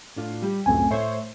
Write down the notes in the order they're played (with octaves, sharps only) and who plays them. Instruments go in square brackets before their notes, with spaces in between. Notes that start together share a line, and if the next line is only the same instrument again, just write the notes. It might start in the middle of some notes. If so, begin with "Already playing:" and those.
[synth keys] A2 D4 F4
G3
[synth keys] C#2 F#2 A2 [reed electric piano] A3 C4 G#5
[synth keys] A2 C5 C#5 [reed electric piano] E5